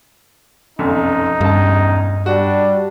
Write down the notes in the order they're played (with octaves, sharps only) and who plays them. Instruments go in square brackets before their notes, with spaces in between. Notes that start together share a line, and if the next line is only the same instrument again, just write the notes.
[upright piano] F1 B1 F#2 [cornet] D#4
[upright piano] E1 C#2 A5 [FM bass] G2
[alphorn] G3 [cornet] D4 [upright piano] F#4 F#5